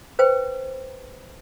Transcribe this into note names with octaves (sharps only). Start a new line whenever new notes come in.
B4 C5 G5